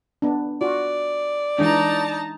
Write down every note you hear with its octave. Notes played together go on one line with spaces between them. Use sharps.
B3 D4
F4 F#4 D5
E3 G#3 D4 D#4 A5 A#5